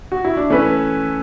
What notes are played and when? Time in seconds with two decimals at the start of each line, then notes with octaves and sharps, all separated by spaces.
0.12 F#4
0.25 E4
0.37 D4
0.50 E3 A3 C#4 E4 B4